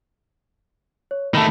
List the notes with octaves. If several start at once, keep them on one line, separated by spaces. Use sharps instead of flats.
C#5
D#3 A3 A5 B5